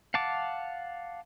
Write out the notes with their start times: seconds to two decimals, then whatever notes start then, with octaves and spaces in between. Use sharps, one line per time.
0.14 F5 F#5 A5 D6